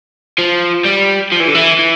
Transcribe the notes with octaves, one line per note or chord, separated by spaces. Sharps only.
F3
G3
F3
E3
D3
E3
E3